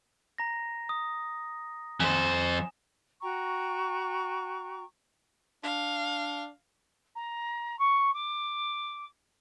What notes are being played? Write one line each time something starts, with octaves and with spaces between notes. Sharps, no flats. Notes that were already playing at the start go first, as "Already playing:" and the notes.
A#5 A#6
D#6
F2 C5 G#5 E7
F#4 G5 A#5 C#6
D4 F5
A#5
C#6
D6